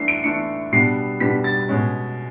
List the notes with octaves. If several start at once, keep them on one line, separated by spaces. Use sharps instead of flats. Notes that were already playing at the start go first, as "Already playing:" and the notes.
Already playing: E3 A3 D4 C7
D7
E3 A3 D4 C#7
B2 G3 B3 D4 C7
B2 G3 B3 D4 B6
A6
B2 G#3 C#4